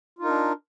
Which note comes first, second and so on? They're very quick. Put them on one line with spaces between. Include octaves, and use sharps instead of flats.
F4 D#4 A#4 D4